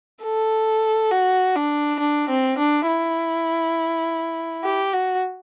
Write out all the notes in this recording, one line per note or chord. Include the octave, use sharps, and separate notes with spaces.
A4
F#4
D4
D4
C4
D4
E4
G4
F#4